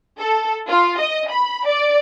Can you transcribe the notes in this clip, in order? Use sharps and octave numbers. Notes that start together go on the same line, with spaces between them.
A4
F4
D#5
B5
D5